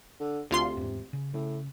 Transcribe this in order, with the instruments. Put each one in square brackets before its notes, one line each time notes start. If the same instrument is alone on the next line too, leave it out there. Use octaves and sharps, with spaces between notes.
[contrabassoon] D3
[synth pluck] D2 F4 C6 [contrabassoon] C3
[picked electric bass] E2 G#2
C#3
[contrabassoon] A2 [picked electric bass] C#3